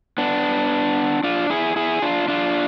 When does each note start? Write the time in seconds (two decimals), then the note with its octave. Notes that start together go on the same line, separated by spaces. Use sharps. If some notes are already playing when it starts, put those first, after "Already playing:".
0.18 B3 D4
1.24 D4 F4
1.50 E4 G#4
1.76 E4 G#4
2.02 D4 F4
2.28 D4 F4